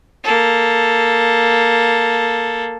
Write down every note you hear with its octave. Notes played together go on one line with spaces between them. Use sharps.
A#3 A4